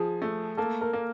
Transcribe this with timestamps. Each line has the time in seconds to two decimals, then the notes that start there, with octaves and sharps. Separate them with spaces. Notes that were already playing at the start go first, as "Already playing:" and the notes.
Already playing: F3 G#4
0.22 A3
0.57 A#3 A4
0.81 A#4
0.93 A#3